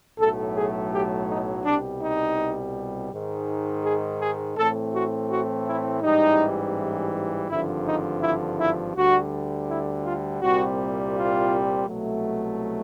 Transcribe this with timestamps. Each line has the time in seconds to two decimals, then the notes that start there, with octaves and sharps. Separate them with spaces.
0.19 B1 A2 F#3 A3 A4
0.55 G#4
0.93 G4
1.29 D#4
1.65 C2 B2 G3 D4
2.02 D#4
3.12 G#2 D#3 G#3
3.84 G#4
4.21 G#4
4.57 A2 E3 A3 C4 A4
4.94 F#4
5.30 F#4
5.67 E4
6.03 A1 G#2 E3 G3 D#4
7.50 G#1 G2 D3 F3 E4
7.86 D#4
8.22 E4
8.59 E4
8.95 D2 D3 G3 F#4
9.68 E4
10.04 F4
10.41 C2 A#2 G3 C4 F#4
11.14 F4
11.88 C2 B2 F#3 A3